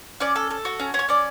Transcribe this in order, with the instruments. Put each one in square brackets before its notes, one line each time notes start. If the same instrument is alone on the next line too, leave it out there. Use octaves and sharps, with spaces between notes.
[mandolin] C#4 D5
A4
A4
F#4
C#4
C#4
C#5
C#4 D5